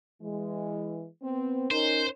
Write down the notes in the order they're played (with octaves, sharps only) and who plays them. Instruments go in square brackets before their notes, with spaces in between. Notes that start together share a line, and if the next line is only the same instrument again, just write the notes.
[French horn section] E3 G#3
B3 C4
[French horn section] C#4 D#4 A#4 [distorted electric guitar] C5